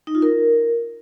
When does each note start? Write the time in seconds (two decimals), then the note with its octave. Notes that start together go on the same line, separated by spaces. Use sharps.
0.07 D#4
0.15 F4
0.22 A#4